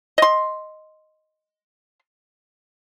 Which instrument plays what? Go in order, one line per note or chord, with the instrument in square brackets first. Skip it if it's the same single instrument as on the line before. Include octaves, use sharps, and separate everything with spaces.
[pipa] D#5 C6